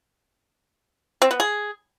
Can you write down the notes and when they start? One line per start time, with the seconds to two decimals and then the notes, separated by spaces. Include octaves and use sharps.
1.22 C4
1.31 B3
1.40 G#4